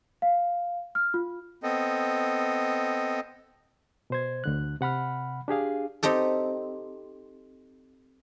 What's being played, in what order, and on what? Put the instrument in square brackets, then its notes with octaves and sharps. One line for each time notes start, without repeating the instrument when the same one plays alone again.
[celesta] F5
F6
F4
[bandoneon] B3 C4 A4 D#5
[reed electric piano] B2 C5 G#6
D2 D3 F#6
C3 F#5 B5 F6
D4 G4 G#4 F5
[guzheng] C4 D#4 G4 A4